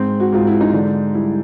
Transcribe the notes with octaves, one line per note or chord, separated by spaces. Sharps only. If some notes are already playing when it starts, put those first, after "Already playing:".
Already playing: G#2 C4
F#4
G#2 F4
E4
D#4
D3 D4
G3 E4